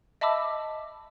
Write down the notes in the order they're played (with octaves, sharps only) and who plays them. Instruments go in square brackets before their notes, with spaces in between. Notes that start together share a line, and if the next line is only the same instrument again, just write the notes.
[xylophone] D#5 E5 A5 B5 D6 E6